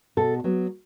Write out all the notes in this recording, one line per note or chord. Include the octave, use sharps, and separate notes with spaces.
B2 A4
F#3 B3